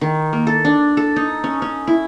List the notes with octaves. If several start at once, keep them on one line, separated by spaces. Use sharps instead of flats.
D#3
A#3
A4
D4
A4
D#4
C#4
C#4
E4